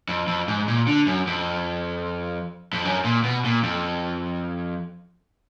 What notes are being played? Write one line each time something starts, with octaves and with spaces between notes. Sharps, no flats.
F2
F2
G#2
A#2
D3
F#2
F2
F2
F#2
A#2
B2
A#2
F2